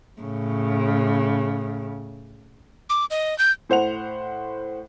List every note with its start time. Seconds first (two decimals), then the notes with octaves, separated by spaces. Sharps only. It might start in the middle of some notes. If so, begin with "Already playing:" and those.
0.21 A2 C#3
2.90 D6
3.10 D#5
3.38 G6
3.70 A2 C5 F#5 F7